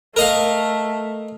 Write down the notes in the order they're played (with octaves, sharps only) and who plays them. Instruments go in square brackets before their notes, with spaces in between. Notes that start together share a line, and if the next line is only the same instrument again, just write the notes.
[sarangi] A3 [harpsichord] A#4 D#5 F5